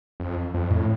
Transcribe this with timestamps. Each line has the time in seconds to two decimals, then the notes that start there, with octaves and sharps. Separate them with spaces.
0.20 F2
0.54 F2
0.70 A2